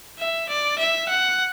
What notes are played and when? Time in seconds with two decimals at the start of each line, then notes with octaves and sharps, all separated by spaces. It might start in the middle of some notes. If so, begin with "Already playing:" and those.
0.19 E5
0.49 D5
0.79 E5
1.09 F#5